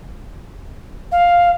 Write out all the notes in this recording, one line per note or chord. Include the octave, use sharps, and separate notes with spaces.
F5